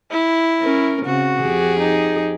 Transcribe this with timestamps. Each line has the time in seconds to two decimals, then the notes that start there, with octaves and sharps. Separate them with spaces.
0.11 E4
0.61 C#4 A#4
1.06 C#3 C4 F#4
1.41 F2 G4 G#4
1.79 D#4